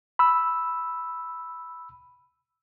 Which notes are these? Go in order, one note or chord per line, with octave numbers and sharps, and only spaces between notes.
B5 E6